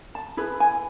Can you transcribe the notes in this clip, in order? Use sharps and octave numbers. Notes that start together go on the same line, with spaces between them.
A5
E4 G#4 B4
G#5